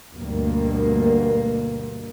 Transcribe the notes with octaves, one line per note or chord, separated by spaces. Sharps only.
D2 G2 B2 A#3